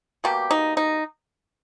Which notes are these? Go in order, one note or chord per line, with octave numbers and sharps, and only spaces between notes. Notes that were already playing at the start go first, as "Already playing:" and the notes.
B2 G3 A#3 G4
D#4
D#4